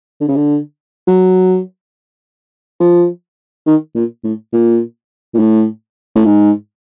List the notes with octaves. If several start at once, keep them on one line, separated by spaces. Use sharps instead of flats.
D3
C#3
D3
F#3
F3
D#3
A#2
A2
A#2
A#2
A2
A2
G#2